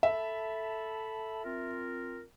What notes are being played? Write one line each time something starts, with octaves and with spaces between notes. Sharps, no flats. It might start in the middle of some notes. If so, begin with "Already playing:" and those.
A4 E5 A5 B5
C4 F4 A#4